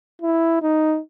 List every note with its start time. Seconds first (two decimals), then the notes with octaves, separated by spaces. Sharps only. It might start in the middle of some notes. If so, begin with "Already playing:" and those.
0.22 E4
0.62 D#4